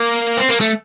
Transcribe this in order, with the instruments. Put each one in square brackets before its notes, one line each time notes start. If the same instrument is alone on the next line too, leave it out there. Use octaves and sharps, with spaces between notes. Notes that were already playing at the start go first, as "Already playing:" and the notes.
Already playing: [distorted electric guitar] A#3
C4
A#3
A3